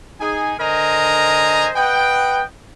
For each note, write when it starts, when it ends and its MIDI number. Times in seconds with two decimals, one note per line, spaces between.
0.21 0.54 63
0.21 0.54 68
0.21 0.54 80
0.59 1.70 50
0.59 1.70 70
0.59 1.70 72
0.59 1.70 75
0.59 1.70 80
0.59 1.70 82
1.76 2.43 71
1.76 2.43 75
1.76 2.43 78
1.76 2.43 79